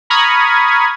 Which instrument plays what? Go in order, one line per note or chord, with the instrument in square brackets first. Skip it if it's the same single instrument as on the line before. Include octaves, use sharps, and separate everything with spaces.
[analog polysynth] A#5 B5 C#6 D#6 F6 G#6